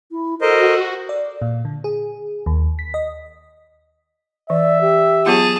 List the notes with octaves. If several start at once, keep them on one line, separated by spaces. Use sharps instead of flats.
E4
F#4 A4 A#4 C5 D#5
D5
A#2
D3
G#4
D#2
B6
D#5
E3 D5 E5
G4
F#3 B3 F4 G#4 A5